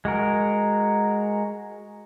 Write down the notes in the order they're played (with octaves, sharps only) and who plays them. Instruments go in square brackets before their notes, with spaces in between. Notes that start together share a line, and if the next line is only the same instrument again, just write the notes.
[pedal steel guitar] G#3 F#4 A#4